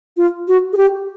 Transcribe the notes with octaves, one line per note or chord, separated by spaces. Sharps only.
F4
F#4
G#4
G4